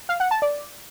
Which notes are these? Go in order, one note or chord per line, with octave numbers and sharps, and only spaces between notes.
F5
F#5
A5
D5